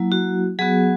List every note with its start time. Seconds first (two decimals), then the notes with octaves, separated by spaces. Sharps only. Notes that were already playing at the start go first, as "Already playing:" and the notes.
Already playing: F#3 A#3 E4
0.12 F#4
0.59 F#3 B3 F#4 G#4